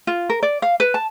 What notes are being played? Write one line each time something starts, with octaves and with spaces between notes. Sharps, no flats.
F4
A#4
D5
F5
B4
A5